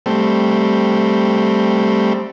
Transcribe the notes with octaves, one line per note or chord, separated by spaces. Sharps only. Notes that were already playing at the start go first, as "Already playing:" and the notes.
G3 A3 C4